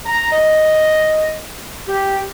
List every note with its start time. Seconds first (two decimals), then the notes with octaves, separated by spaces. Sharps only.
0.06 A#5
0.32 D#5
1.88 G4